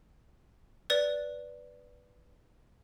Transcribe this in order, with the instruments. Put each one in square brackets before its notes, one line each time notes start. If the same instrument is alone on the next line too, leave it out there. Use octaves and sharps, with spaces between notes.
[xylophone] B4 D5